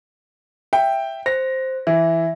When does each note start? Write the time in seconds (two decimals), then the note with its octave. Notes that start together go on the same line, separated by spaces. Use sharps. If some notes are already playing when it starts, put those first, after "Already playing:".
0.73 E5 G5
1.26 C5 A#6
1.87 E3 E5